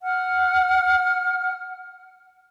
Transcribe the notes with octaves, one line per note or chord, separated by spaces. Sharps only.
F#5 F6